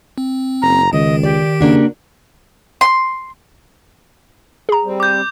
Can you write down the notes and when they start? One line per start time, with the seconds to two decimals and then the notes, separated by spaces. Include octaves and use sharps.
0.18 C4
0.62 F#1 A#5
0.93 C#2 D#3 D#5
1.23 G4 D5
1.61 C#3 A#3 D4 F#4
2.81 C6
4.69 G#4 A#5
4.84 G3 C4
5.00 D6 G6